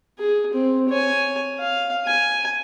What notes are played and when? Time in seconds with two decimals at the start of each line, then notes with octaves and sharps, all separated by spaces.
0.19 G#4
0.53 C4
0.89 C#5 G#5
1.58 F5
2.06 G#5